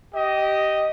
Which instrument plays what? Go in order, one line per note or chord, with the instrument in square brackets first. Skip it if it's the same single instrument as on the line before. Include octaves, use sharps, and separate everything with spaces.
[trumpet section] G4 D#5